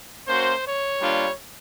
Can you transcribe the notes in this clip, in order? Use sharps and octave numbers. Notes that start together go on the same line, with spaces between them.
A#3 C#4 F#4 C5
C#5
G3 A#3 D4 F4